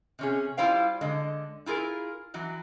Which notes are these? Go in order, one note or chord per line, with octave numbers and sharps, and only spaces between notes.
C3 C#4 G#4
G3 E4 F4 C5 F5 G5
D3 G#3 D#5
E4 F4 G#4 A#4
E3 F#3 F#4